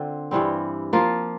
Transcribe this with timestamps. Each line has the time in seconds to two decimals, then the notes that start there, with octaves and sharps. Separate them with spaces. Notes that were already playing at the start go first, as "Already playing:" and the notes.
Already playing: D3 C4 F4
0.31 G2 E3 G3 C4
0.93 F3 A#3 F4